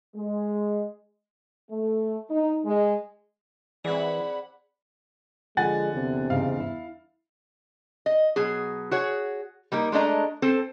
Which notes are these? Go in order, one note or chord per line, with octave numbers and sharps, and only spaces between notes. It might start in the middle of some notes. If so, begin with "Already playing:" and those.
G#3
A3
D#4
G#3
E3 C4 G#4 D5 F#5 B5
D3 F3 G#3 F#5 G#5 A6
E2 C3
G#2 C#3 F5
E4
D#5
B2 F#3 G#4
F#4 G#4 C#5
G3 A#3 D#4 A#4
G#3 A3 D4 D#5 A#5
C4 A4 C5